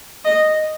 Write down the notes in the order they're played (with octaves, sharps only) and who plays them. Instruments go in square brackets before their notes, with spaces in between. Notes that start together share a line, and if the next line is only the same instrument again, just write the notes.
[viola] D#5